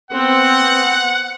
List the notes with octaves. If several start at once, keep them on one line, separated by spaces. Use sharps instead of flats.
B3 C4 F#5